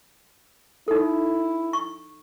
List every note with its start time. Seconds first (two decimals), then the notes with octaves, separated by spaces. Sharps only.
0.88 D#4 E4 A4
1.73 C#6